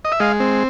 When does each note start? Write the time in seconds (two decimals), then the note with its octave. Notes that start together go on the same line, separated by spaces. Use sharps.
0.05 D#5
0.12 E5
0.20 G#3 D#5 F5
0.40 C4